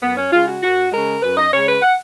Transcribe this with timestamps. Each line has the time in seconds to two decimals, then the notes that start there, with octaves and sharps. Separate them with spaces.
0.02 F#2 B3
0.17 C#4
0.32 C#3 G#3 F4
0.47 F#4
0.62 F#2 F#4
0.92 C#3 G#3 A#4
1.22 F#2 B4
1.37 D#5
1.52 C#3 G#3 C#5
1.67 B4
1.81 F#5